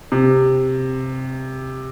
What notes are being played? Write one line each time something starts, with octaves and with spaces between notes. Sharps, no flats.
C3